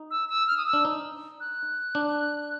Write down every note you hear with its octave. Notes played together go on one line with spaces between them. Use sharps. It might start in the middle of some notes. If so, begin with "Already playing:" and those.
Already playing: D#4
E6
E6
F6
D#6
E6
D4
D#4
F#6
D4